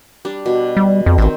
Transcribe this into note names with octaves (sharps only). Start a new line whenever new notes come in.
G3 D4
B2
G3
F2
A1 D#3 C4